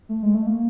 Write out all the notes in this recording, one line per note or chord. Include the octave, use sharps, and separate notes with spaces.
A3
G#3
A3
A#3